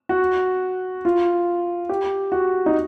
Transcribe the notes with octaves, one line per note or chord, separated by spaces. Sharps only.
F#4
F4
G4
F#4
D#4